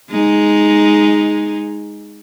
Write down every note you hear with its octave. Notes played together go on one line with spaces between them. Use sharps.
G#3 D#4